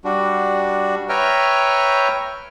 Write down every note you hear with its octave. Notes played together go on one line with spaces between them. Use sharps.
G3 D4 F#4
B4 C#5 E5 G5 A#5 F6